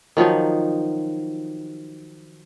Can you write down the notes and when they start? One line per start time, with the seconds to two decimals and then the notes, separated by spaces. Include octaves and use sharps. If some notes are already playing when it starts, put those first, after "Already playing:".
0.17 D#3 F3 F#3 D#4